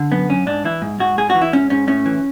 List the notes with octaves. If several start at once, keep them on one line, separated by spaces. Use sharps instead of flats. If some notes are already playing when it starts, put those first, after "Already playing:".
Already playing: D3
F#2 B3
F#2 C#4
G#2 D4
E3 E4
G#2
G#2 F#4
G#2 G#4
F#4
E3
E4
G#2 C#4
G#2 C#4
A2 C#4
E3